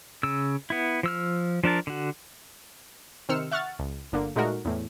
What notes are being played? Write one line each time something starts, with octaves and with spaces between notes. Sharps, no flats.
C#3 E6
B3 E4
F3 E6 F6
F3 D4 A#4 A5
D3 F#4
C3 D#3 C5 E6 F6 C#7
E5 F#5 C#6 F6 A6
C#2
G1 D3 A#3
A#2 G#3 A3 D#4 F#4 A#4
E2 A2